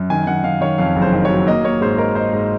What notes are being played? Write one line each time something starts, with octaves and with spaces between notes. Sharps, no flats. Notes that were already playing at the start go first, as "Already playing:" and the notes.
Already playing: F#2
D#3 G#5
D#3 F#5
D#3 F5
D#3 C#5
F2 F5
F#1
C5
D#3
C#5
F#3
A#3 D#5
A#3 C#5
G#2 C5
D#4 A#4
D#4 C5
G#2